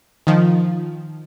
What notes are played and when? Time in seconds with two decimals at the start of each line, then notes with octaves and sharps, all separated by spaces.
0.27 D#3 F3